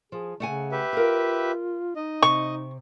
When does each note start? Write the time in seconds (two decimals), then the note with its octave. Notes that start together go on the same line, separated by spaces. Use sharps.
0.12 F3 G#4
0.40 C#3 A3 F#5 G#5
0.72 G4 B4 E5
0.93 F4 A#4 F5
1.96 D#4 D#5
2.22 C3 C#6